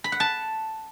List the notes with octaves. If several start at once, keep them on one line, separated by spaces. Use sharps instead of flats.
B5
F#5
A5